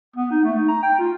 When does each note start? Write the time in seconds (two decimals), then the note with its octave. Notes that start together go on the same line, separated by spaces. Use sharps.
0.16 B3
0.31 D#4
0.44 A3
0.57 D#4
0.68 A#5
0.83 G5
0.99 F4